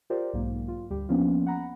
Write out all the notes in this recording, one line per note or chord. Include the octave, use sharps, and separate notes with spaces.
F4 G4 A#4 C5 D5
B1 G#2 A#3
F4
D2 G3 G4
F3 A#3 B3 C#4 D4 F4
F#5 A#5 B5